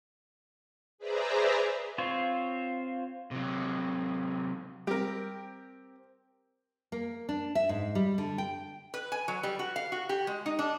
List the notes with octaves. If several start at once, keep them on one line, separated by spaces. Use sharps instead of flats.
G#4 B4 C5 D5 E5 A#5
C4 F4 C5 C#5
C3 F#3
G3 C4 G4 A#4
A#3
D4
E5
G#2
G3
D3
G5
B4
G#5
F#3
G3
F#4
F5
F#4
G4
G#3
D#4
D4